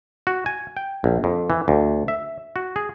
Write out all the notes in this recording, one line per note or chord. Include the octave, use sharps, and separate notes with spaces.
F#4
G#5
G5
A#1
F2
E3
D2
E5
F#4
G#4